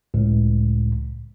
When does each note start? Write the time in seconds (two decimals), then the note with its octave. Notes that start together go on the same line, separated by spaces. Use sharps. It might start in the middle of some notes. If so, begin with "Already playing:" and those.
0.14 C#2 A2